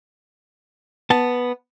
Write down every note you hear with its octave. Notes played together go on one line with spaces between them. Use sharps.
B3 A5